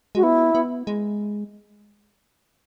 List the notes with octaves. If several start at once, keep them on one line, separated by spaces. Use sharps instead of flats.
G#3 F#4
B3 E4
B3
G#3